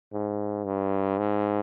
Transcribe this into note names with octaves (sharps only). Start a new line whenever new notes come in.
G#2
G2
G#2